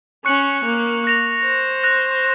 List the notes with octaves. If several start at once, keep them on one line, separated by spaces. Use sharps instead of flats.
C#4 C#6 F#6 C#7 F#7
A#3
F#6 A#6 F7
C5
F#6 A#6 F7